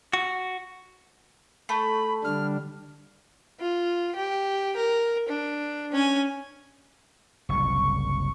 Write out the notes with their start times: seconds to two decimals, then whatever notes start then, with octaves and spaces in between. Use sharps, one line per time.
0.13 F#4
1.69 A3 B5
2.24 D3 G3 D4 F6
3.60 F4
4.15 G4
4.76 A#4
5.28 D4
5.92 C#4 G#5
7.49 F#1 C2 C#6